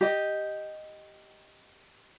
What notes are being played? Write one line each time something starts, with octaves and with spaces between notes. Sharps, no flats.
G4 D#5